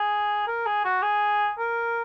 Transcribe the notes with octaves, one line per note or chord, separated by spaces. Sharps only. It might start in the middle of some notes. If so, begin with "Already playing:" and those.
Already playing: G#4
A#4
G#4
F#4
G#4
A#4